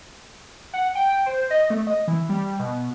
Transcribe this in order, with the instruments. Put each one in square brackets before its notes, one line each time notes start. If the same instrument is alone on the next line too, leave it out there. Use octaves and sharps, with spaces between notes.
[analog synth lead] F#5
G5
C5
D#5
A3
D#5
E3
G3
B2